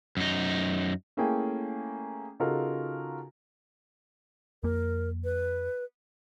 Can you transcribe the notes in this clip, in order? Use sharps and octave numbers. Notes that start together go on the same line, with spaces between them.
F#2 D#4
A3 A#3 C#4 E4 G#4 G5
C#3 D#4 F4 F#4 A4 A#4
F2 A#3 A#4
B4